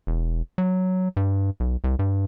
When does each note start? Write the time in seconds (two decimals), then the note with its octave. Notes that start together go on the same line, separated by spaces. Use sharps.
0.07 E1
0.58 F#3
1.17 G2
1.60 B1
1.84 C2
1.99 G2